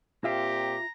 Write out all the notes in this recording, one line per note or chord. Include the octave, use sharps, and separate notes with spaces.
A#2 C4 F4 G4 E5 F5 A#5